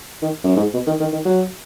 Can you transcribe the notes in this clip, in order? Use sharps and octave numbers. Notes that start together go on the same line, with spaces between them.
D#3
F#2
G#2
B2
D#3
D#3
D#3
F#3